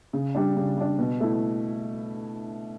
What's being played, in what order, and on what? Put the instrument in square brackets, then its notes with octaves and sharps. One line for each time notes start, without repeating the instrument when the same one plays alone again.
[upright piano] C#3
G3 D4
C#3
G3 D4
B2
A3 E4